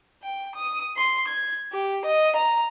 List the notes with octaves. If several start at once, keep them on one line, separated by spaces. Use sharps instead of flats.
G5
D#6
C6
G#6
G4
D#5
A#5